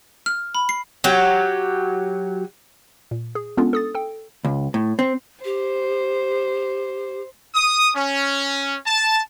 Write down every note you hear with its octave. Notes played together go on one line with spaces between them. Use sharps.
F6
B5
C7
F#3 G4
A#2
G#4
G#3 B3 C#4 D4 F4 A4
A4 D#6 A6
A4 G5
C#2
A2
C4
G4 C5
D#6
C#4
A5